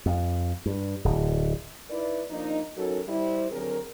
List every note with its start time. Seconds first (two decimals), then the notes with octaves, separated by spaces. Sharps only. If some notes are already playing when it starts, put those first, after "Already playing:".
0.06 F2
0.66 G2
1.05 D1
1.90 D#4 E4 B4 D5
2.30 F3 A#3 D4 D#4
2.76 F#3 C#4 D#4 F#4 A4 A#4
3.08 G3 E4 C5
3.51 D3 F#3 C4 G#4 A#4